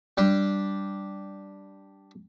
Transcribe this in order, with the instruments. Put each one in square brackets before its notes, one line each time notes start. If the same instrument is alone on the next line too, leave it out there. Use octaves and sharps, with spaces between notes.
[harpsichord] G3 D4